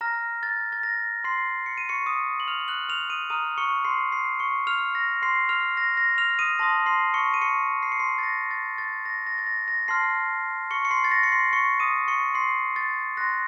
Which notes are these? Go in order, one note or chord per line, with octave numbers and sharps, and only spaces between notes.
A#5 F6 A#6
A6
A6
A#6
C6 C7
C#7
D#7
C#6 C#7
D#6 D#7
F#7
F6 F7
F#6 F#7
F6 F7
D#6 D#7
A#5 D#6 F6 D#7
C#6 C#7
C6 C7
C6 C7
C#6 C#7
F6 F7
A#6
C6 C7
F6 F7
A#6
A#6
F6 F7
D#6 D#7
A5 C6 D#6 A#6
C6 C7
C#6 C#7
D#7
C#6 C#7
C7
C#7
C6 C7
A6
A#6
A6
A6
A#6
A#6
A6
A#6
A#6
A5 C6 F6 C7
C#6 C#7
C#7
C6 C7
A6
A#6
C#7
C6 C7
C#6 C#7
D#6 D#7
C#6 C#7
C6 C7
A6
C6 F#6 A#6